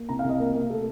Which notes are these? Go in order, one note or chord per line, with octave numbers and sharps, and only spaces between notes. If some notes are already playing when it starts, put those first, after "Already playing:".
Already playing: A#3
C2 A#5
F5
C2
D#5
A#3 A#4
A#3
A3 A4